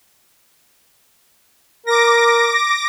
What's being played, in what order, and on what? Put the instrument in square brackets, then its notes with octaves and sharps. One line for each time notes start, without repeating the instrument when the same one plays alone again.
[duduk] A#4 [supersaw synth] D6 A#6